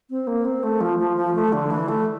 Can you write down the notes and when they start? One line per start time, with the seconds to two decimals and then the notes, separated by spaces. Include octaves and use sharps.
0.10 C4
0.27 A#3
0.45 C4
0.63 A3
0.81 F3
0.99 F3
1.17 F3
1.35 A3
1.53 D3
1.71 E3
1.88 A3